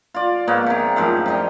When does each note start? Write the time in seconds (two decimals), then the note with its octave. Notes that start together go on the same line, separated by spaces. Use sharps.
0.14 F4 D5
0.48 G#2 A#3 B3 C#5
0.66 C3 D#3
0.96 F#2 A2 F3 F5
1.26 C3 G3 D#5